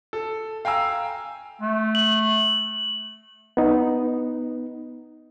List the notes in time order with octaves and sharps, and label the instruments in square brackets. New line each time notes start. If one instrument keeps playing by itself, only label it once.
[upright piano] A4
F5 G5 G#5 A#5 E6
[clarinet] A3
[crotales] F#7
[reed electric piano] B3 D#4